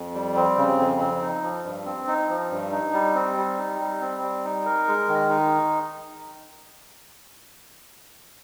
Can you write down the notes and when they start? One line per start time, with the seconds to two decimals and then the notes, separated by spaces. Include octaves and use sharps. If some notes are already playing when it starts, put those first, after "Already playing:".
Already playing: F2
0.14 G3
0.36 C4
0.57 C#3
0.79 F2
1.00 C4
1.21 D#4
1.43 F3
1.65 G2
1.86 C4
2.08 D#4
2.30 F3
2.51 G2
2.72 D#4
2.93 G3
3.15 C4
3.37 G3
3.58 D#4
3.79 G3
4.01 C4
4.22 G3
4.45 D#4
4.65 A#4
4.88 G#3
5.09 D#3
5.30 D#4